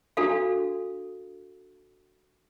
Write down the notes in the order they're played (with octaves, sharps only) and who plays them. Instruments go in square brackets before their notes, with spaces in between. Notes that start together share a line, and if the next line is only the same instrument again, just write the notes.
[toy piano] D4 F#4 A4 F5